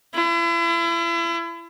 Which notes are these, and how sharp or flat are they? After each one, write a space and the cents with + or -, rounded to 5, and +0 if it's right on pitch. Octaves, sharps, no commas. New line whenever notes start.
E4 +40